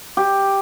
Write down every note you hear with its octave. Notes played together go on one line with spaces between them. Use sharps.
G4